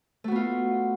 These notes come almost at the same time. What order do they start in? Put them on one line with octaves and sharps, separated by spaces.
A3 F#4 B3 F4